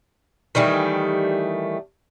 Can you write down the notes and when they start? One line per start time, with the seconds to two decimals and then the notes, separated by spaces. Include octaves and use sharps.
0.55 D#3 E3 G3 A3